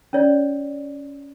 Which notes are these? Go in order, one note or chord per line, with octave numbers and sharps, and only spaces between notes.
C#4 C#5 D5